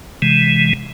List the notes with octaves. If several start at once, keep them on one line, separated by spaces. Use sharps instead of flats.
C3 E3 G#3